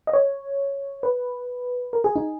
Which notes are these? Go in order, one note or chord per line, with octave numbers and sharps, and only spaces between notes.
D#5
C#5
B4
A#4
G#4
D#4